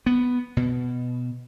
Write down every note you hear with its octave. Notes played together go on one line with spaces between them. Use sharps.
B3
B2